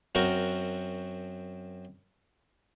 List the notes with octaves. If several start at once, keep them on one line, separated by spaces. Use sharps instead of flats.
F#2 C4 F#4 A#4 C#6